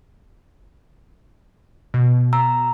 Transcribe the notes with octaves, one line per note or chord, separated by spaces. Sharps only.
B2
A#5 E6